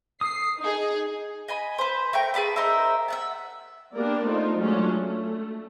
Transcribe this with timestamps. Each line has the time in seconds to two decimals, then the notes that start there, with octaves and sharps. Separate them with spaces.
0.21 D#6 C7
0.59 D#4 G#4
1.48 D#5 G#5 B5
1.78 B4 C5
2.13 A3 A#4 G5
2.34 G#4 B4 A5 B5
2.56 D#4 A#4 C5 E5
3.08 E5 F#5 A5
3.94 A#3 B3 D4 G4 A#4 D5
4.23 A3 D#4 F4 C5
4.57 F#3 G#3 A3 C#4 D4 F4
4.99 A3